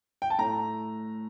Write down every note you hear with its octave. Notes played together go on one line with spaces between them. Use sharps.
G5
A5
A2 A3 A#5